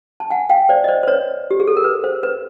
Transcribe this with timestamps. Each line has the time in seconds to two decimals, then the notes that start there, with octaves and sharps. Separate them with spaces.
0.20 A5
0.30 F#5 G#5
0.49 F5 G5
0.69 C5 D5
0.84 D#5
0.88 C5 D5
1.03 C5
1.07 B4 C#5
1.51 G4
1.60 G#4
1.67 A4
1.77 A#4
1.84 B4
2.04 C5
2.23 B4